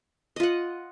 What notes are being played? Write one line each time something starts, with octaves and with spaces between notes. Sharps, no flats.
F4 D#5 F#5